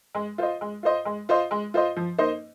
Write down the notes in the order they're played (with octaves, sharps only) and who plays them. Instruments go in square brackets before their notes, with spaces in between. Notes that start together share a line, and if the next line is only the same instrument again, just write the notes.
[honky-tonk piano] G#3
F4 C5 D#5
G#3
F4 C5 D#5
G#3
F4 C5 D#5
G#3
F4 C5 D#5
F3
A#3 D#4 C5 D#5